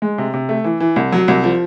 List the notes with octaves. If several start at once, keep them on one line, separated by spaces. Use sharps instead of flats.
G#3
C3
C3
A3
E3
E3
C2
F#3
C2
F3